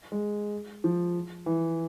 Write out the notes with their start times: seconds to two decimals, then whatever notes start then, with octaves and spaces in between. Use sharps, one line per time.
0.12 G#3
0.84 F3
1.46 E3